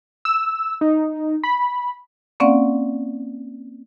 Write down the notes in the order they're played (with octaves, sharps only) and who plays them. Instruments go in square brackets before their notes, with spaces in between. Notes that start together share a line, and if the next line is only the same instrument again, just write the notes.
[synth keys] E6
D#4
B5
[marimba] A#3 C4 C#4 D5 F5 F#5